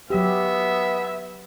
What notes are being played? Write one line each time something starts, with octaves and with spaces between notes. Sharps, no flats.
F#3 G#3 B3 G4 E5